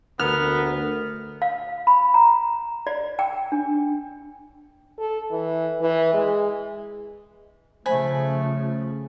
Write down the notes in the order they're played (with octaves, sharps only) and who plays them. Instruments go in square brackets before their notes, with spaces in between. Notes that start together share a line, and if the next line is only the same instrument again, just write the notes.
[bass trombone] D2 [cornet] B3 [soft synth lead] A#4 [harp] F6
[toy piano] F5
B5
A#5
D5
G5
D4
[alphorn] A4
E3
E3
G#3
[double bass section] C#3 F3 [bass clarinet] A3 [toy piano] C5 [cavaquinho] G#5 B5